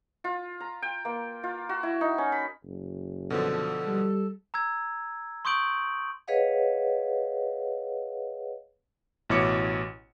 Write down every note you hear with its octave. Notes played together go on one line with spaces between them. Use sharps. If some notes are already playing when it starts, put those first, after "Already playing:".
F4
A#5
G5
A#3
F4
F#4
E4
D#4
C#4
B5
F#1
B2 D3 F3 A4
G3
A#5 E6 G#6
C6 C#6 D#6 G6 D7 F#7
G#4 B4 C#5 D#5 F5 F#5
A1 B2 E4 C#5 D6 C#7